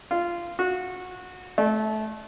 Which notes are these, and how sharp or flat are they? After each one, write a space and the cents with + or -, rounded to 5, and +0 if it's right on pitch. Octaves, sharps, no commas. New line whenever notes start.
F4 -15
F#4 -20
A3 -25